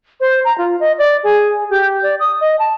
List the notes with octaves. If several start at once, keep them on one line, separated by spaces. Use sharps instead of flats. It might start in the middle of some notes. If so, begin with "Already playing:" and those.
C5
A#5
F4
D#5
D5
G#4
G4
D5
D#6
D#5
A5